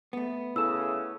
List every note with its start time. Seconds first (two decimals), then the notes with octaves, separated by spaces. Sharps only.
0.13 A3 B3
0.56 C#3 E4 A4 E6 E7